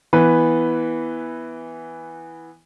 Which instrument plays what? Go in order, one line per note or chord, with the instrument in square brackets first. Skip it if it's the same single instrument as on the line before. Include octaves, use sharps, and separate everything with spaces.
[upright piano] E3 B3 B4